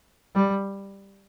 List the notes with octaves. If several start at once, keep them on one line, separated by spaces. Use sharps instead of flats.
G3